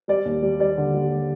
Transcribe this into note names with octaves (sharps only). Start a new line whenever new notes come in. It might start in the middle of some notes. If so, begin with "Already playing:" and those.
G3 D5
D#2
G3
G3 D5
D3
G3